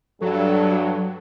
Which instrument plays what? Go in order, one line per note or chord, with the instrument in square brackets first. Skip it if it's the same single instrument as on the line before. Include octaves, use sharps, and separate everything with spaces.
[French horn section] G2 [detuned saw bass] F#3 [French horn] A4